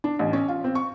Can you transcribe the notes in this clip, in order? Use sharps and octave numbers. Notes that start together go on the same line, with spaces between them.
D4
A1
C#4
F4
C4
C#6